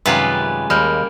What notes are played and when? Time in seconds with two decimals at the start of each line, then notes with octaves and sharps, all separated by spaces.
0.06 F#2 C3 D#3 G3 G#3 C#4 F4 B4
0.70 D#2 G3 G#3 A#3 B5 F6 G6